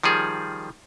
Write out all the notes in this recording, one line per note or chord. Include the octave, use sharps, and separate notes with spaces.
D#3 F3 G3 G#4